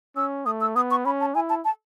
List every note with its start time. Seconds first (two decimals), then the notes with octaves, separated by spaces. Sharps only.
0.16 C#4 E6
0.46 A3 D#6
0.61 E6
0.76 B3 D#6
0.91 C#6
1.05 C#4 B5
1.20 A5
1.35 E4 G#5
1.50 A5
1.64 A5